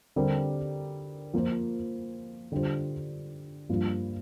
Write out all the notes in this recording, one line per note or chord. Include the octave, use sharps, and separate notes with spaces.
D3 G3 C4 G4 A#4
F3 A#3 F4 C5
D3 G3 D4 F4 C5
G2 F3 A#3 F4